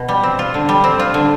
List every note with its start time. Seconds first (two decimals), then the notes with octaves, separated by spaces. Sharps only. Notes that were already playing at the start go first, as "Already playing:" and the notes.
Already playing: B2
0.09 G3
0.23 C4
0.39 F4
0.54 D3
0.69 G3
0.84 C4
0.99 F4
1.14 D3